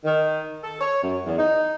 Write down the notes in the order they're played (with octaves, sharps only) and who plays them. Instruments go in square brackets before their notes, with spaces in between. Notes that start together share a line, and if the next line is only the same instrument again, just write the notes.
[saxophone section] D#3
A4
C#5
F#2
E2
D#4